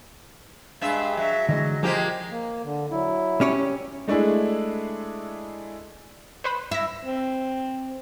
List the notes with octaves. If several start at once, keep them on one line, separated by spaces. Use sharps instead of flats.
G2 G#3 E5 F5
F#3 E5
D3 E3 G#3 D#5
F3 G#3 A#3 F4 G4 C5
A#3
D3
F#3 E4
C#4 G4 C#5
G#3 A3 D4 E4 G#4
B4 C5 B5
E4 A#6 B6
C4